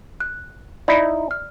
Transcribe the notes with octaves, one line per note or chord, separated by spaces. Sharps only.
F#6
D#4 E4 D5 B5
F6